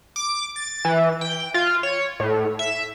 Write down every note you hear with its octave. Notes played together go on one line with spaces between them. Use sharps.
D6
A6
E3
G5
F4
C#5
A2
E5